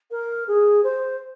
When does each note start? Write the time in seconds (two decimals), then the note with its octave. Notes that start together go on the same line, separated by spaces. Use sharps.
0.11 A#4
0.47 G#4
0.84 C5